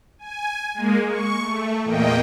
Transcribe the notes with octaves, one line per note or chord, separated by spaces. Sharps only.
G#5
G#3 A#3
C#6
A3
E2 A#2 A#3 D#5 G5